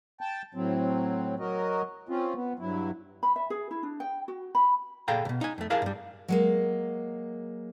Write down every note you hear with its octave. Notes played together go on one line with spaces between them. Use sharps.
G5 A5
A2 F#3 C4
F#3 F#4 A#4 D#5
C4 C#4 F4
B3
G2 F#3 E4
B5
E5
G#4
E4
D4
G5
F#4
B5
A#2 G#4 A4 F5 G5 A#5
B1 B2
D#4 G#5
F2 A3
E4 G4 G#4 A#4 F5 A5
G2 G3
F#3 G#3 A#3